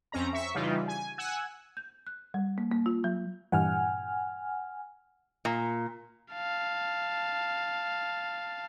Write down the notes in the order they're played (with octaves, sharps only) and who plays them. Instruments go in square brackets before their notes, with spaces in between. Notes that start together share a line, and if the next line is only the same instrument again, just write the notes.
[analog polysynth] F2 C4 C#4 A#5
E5 C#6 B6
C#3 E3 G3 D#4 F4
G#5
F#5 G#5 E6 F#6
[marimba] G6
F#6
G3
A#3
A#3
F4
F#3
[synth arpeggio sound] G2 A#2 E3 [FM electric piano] F#5 G#5 F6
[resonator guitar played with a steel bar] A#2
[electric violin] F5 A5